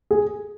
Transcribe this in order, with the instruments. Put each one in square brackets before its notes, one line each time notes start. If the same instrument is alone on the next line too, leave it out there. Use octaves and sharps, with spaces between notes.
[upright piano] G#4